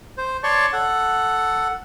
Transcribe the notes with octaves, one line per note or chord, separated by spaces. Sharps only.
C5
C#5 D5 A5 C6 C#6
A4 F#5